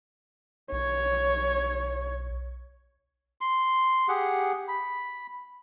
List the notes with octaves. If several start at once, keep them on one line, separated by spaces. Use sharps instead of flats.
B1 C#5
C6
G4 G#4 F#5
B5